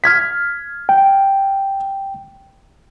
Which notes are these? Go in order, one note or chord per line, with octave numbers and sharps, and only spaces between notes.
F6 G#6 B6
G5